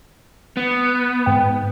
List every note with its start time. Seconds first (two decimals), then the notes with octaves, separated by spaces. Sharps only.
0.57 B3
1.26 G#2 G5